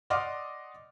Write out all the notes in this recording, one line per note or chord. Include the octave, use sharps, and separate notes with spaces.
D5 D#5 F#5 C6 D6 F6